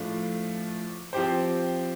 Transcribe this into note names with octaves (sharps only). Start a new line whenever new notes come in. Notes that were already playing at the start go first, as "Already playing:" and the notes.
Already playing: A2 F3 A3 D4 F4
F3 C4 G4 C5